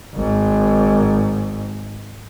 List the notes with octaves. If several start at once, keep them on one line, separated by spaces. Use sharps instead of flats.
G#1 G#2